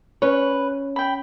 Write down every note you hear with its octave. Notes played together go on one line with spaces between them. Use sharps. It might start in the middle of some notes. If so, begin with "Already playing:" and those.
C#4 B4 C#5
G5 B5